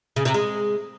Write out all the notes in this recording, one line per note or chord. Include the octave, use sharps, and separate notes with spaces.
C#3
C3
G#3